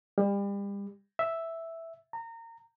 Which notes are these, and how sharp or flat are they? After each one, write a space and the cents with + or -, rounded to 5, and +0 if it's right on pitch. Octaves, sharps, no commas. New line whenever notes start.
G3 +35
E5 +0
A#5 -25